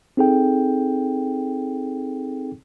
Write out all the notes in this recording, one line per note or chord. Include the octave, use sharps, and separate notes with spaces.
C4 D#4 G#4 A4 G5